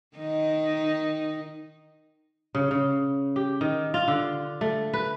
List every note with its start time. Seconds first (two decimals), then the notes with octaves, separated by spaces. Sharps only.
0.17 D#3 D#4
2.55 C#3
2.71 C#3
3.36 G4
3.61 D#3
3.94 F4
4.08 D3
4.61 A3
4.93 B4